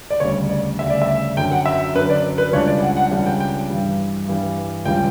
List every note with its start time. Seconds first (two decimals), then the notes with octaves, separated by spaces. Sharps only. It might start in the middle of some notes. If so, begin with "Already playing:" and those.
0.10 D5
0.20 D2 C#3 G3 C#5
0.50 D5
0.79 D2 C#3 G3 E5
0.90 D5
1.02 E5
1.37 F#2 D3 F#3 G5
1.52 F#5
1.66 E5
1.95 F#2 D3 F#3 B4
2.10 D5
2.38 B4
2.53 C#2 C#3 G3 D4 C#5
2.68 D5
2.82 F#5
2.97 F#5
3.11 C#2 C#3 G3 D4 F#5
3.26 G5
3.40 G5
3.70 G2 E3 G3
4.28 G2 E3 G3
4.85 C#2 C#3 G3 G5